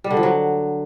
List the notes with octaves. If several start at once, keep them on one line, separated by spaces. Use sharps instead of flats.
G3
D3
F3
F#3